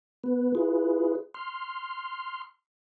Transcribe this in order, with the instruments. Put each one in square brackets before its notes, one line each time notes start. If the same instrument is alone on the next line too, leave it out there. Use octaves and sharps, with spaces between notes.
[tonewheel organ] B3 B4
E4 F4 G#4 B4
C6 F6